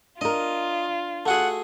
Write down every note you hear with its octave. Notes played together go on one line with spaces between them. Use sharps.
D4 F4 A#4 D#5
A3 F#4 G#4 F#5